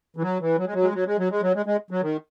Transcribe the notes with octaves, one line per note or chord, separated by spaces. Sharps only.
E3
F#3
E3
F#3
G#3
F#3
G#3
F#3
G#3
F#3
G#3
F#3
G#3
G#3
F#3
D#3